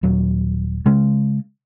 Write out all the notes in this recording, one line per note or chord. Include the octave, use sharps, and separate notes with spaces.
D#1 F#3
C#3 G#3